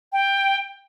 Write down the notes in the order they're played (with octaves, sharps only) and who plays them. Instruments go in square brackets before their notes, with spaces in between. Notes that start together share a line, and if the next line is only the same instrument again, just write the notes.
[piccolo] G5